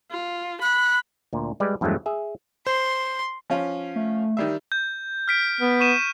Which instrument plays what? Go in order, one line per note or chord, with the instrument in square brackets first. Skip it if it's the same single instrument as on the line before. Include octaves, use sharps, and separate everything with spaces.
[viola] F4
[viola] B5 [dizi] F#6
[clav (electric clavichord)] D2 A#2
G3 G#3 B4 D5
E2 G2 F3 F#3 G#3 A3
G#4 E5
[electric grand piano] C5 [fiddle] C6
[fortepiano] F3 C#4 F4
[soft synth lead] A3
[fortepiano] D#3 G3 E5
[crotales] G6
F6 B6 D7
[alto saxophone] B3
[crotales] C#6 D#7 E7